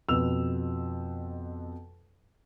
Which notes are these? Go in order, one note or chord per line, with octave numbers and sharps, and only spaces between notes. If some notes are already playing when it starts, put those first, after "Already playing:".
F2 B2 B4 E6 F7